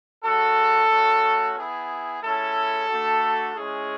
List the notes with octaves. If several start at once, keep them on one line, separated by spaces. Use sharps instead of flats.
G#3 C#4 F#4 A4
A3 C#4 F#4
B3 E4 G#4
G#3 C#4 E4 A4
A3 D4 F#4
G#3 C#4 E4 G#4